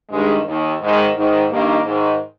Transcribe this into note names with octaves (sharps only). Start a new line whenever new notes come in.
G2 D#3 G#3
D#2 D#3
G#2 D#3 G#3
G#2 D#3
G2 D#3 A#3
G#2 D#3